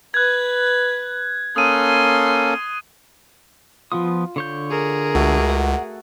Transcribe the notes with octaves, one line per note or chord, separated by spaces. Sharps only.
B4 F#6 G#6
A#3 C#4 A4 C6 D#6 D#7
F3 B3 F4 D#6
D3 C#5 G6
G#4 A#4
C#2 A3 F#4 A4
F#5